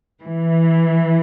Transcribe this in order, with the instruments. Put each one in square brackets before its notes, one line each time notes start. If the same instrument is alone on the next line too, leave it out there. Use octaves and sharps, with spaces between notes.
[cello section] E3